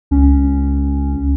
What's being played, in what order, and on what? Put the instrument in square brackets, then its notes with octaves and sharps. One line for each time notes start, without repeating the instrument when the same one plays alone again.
[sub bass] C#2 [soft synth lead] C#4